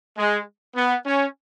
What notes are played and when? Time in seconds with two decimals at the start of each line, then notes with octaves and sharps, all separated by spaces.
0.18 G#3
0.76 B3
1.06 C#4